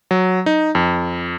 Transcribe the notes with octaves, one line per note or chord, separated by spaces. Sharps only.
F#3
D#4
F2